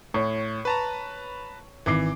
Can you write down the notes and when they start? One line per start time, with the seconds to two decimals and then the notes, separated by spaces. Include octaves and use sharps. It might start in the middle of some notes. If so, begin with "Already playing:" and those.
0.14 A2 C#5 C#6
0.65 B4 A5 A#5
1.86 G#1 E3 D6 C7